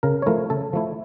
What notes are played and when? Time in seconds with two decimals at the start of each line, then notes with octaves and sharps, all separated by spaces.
0.03 C#3 A#4
0.22 C#5
0.26 F3 A3 E4 A#4
0.50 C#3 A4
0.73 F3 A3 E4